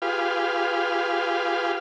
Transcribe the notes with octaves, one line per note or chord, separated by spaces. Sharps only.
F4 G4 G#4 B4 F5